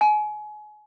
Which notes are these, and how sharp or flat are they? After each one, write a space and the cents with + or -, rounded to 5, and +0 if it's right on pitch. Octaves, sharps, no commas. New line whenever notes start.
G#5 +30